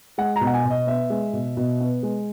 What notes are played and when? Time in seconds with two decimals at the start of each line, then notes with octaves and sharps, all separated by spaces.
0.18 G#3 F#5
0.36 A#5
0.41 B2
0.47 F#5
0.54 G#5
0.65 B2
0.70 D#5
0.87 B3 E5
1.10 G#3
1.33 B2
1.57 B2
1.80 B3
2.03 G#3